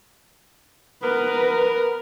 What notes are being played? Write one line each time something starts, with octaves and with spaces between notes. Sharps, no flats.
B3 A#4 B4